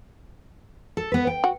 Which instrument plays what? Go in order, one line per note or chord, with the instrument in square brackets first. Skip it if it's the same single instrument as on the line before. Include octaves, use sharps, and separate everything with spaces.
[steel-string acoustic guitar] A4
B3 B4
G5
[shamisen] F#4